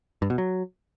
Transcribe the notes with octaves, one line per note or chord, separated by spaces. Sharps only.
G2
B2
F#3